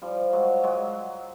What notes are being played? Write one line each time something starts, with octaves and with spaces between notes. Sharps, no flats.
F3 G3
F#3 G#3
F#3 G#3